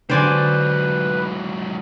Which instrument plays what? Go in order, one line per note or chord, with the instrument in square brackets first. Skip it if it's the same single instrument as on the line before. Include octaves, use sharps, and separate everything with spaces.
[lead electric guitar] G#2 F#3 [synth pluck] D3 [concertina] B4 [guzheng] C5 D5 G#5